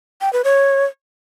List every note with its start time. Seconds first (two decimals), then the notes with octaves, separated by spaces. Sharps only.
0.21 G5
0.33 B4
0.44 C#5